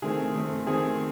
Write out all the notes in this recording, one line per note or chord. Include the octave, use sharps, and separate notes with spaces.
D#3 A3 C4 G#4
D#3 A3 C4
D#3 A3 C4 G#4